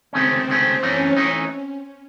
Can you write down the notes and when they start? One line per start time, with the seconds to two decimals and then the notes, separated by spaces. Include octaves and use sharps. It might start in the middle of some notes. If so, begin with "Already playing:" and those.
0.13 C#2 C3 D#3 A3 C4 C#4
0.47 C#2 C3 D#3 A3 C4 C#4
0.82 F#2 E3 A3 C#4 D#4
1.17 E3 A3 D#4